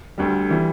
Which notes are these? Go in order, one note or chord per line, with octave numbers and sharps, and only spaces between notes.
D2 D3 G3
E3 G3